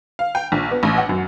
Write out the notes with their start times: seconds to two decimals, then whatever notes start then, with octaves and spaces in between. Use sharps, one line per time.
0.19 F5
0.35 G5
0.52 A#1
0.71 B3
0.83 A1
0.97 F#5
1.09 F#2